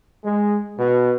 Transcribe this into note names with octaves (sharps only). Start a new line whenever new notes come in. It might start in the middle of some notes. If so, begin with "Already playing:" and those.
G#3
B2